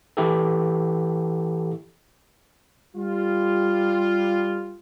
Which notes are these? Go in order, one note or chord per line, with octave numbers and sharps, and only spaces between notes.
E3 E4 G4 A4
G3 F4